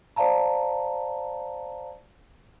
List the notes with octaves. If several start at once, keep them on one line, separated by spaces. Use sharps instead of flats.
C5 D5 F5 A5 A#5